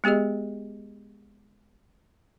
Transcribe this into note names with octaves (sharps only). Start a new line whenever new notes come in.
G#3 B3 G4 G#4 D#5